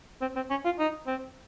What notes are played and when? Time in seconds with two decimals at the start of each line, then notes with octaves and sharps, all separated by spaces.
0.21 C4
0.36 C4
0.50 C#4
0.65 F4
0.79 D#4
1.07 C4